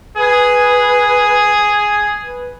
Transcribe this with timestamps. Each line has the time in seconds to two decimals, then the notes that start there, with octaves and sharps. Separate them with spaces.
0.18 G#4 B4
2.22 B4